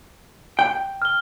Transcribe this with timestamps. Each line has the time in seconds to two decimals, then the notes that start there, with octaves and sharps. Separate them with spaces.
0.59 G5
1.02 F6 G7